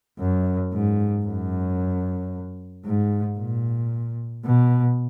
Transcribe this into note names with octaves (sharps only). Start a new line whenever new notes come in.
F#2
G#2
F#2
G#2
A#2
B2